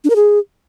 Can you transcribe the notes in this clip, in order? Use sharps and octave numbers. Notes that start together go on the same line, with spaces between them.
D4
A#4
G#4